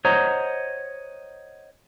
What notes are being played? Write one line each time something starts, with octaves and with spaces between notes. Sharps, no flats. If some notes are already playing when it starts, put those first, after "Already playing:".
C5 C#5 D#5 F#5 A#5